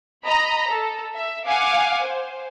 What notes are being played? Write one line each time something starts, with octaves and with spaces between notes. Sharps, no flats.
D#5 A#5 B5
A4
E5
F5 F#5 G#5 D6
C5